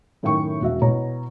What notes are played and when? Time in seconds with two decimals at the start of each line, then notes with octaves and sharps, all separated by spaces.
0.23 F#2 A2 D#3 G5 C#6
0.61 E1 F#4 E5
0.82 B2 E4 C#5 A#5